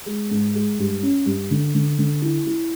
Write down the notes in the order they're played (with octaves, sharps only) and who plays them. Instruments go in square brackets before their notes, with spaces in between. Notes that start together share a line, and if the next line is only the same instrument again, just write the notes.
[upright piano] G#3
G#2
G#3
G2
C#4
G2
D3
D3
D3
E4
E4